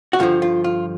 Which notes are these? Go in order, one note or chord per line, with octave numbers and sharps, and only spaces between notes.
F#4
G2 D3 F3 F4
F4
F4